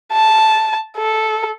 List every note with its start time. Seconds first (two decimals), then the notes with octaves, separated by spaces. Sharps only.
0.13 A5
0.97 A4